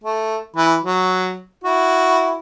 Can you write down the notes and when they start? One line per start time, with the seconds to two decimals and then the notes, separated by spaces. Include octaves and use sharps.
0.04 A3
0.56 E3 B5
0.83 F#3
1.64 E4 F#4